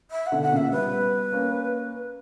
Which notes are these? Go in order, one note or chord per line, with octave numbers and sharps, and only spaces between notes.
E5
F#5
B2 D3
F#5
A#2 C#3 E5
G3 B3 B4
A#3 C#4